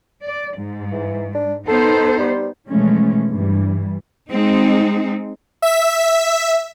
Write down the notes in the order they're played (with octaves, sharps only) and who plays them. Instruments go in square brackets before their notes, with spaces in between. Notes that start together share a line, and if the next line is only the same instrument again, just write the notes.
[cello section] D5
G#2
[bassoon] E3
D4
[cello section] B3 D#4 C5 [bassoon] A4
[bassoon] G3
[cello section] B2 E3 F3 G#3 A3 C#4
G2 E3 G3
G#3 C4 D#4
[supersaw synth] E5 B6